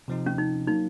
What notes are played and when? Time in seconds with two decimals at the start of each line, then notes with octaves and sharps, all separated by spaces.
0.08 C3 F3 C4 D#4
0.26 C#4
0.38 D#4
0.67 F#3 A#3 D#4